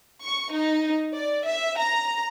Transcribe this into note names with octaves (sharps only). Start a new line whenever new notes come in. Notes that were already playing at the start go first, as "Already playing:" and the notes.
C#6
D#4
D5
E5
A#5